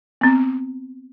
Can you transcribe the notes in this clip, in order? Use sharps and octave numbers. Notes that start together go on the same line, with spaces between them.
B3 C4